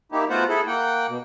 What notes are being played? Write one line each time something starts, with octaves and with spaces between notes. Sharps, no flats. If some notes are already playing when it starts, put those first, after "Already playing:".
A#3 D#4 E4 G4
A3 B3 F4 F#4 C5 F#5
E4 G#4 A4
A#3 F#5 G5
B2